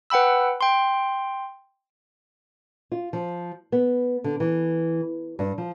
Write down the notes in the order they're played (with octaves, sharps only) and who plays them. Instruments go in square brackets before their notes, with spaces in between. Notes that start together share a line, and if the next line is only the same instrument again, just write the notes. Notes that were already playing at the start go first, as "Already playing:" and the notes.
[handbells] B4 F#5 G5 B5 E6
G5 C6
[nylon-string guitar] F4
F3
B3
D3
E3
G2
F3